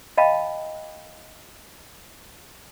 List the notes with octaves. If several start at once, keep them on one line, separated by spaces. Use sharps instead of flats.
D#5 F5 G5 A5 B5